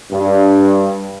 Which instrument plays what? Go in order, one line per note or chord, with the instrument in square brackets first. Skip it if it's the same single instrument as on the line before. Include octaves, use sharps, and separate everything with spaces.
[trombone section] G2